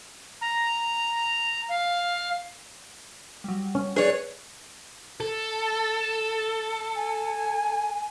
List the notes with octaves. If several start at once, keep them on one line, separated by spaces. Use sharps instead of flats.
A#5
F5
F#3 G3
C#4
G#4 B4 C#5 D5
A4
G#5